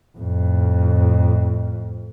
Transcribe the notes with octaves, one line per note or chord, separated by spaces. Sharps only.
F2 A2